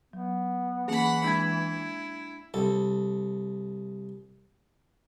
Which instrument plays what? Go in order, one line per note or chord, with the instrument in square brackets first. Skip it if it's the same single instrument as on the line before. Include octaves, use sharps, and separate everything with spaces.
[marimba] F#3 [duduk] B3
[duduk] E3 [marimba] A#3 C#4 [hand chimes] G#4 [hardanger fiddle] F#5 B5
[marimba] G#3 [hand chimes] D4 G#6 [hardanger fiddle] E4
[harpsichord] C2 A4